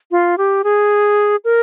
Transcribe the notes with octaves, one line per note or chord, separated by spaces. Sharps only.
F4
G4
G#4
A#4